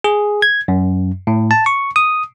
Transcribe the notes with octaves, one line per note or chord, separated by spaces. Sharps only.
G#4
G#6
F#2
A2
A5
C#6
D#6